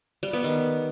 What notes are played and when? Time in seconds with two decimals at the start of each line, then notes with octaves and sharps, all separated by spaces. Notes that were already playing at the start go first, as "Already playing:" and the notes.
0.23 G3
0.33 B3
0.44 D#3